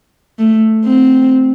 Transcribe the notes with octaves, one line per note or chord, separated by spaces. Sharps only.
A3
C4